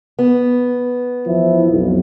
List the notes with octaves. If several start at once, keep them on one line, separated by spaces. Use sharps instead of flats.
B3
E2 F3 E4
B1 F2